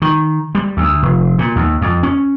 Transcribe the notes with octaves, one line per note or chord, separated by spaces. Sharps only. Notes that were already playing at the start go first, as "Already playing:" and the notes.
D#3
G3
D2
F1
A#2
D#2
F2
C#4